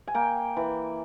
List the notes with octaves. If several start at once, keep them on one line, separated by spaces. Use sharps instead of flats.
G#5
A#3 G5
E3